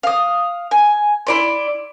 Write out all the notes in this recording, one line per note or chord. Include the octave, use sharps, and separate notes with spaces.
F5 D#6
G#5
E4 D5 C6